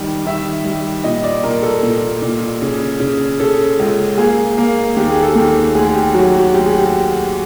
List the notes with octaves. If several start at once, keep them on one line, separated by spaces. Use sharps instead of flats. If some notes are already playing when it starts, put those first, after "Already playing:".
Already playing: D#3 G3
D#3 E5
G3
A#2 D#5
D5
A#2 A#4
A4
A#2
A#2
C#3
C#3
C#3 A4
C#2
A#3 G#4
A#3
D#2 G4
G#4
A4
D#2
D2 G#4
G4
F#3 F#4
F#4
D2 G4
G#4
G4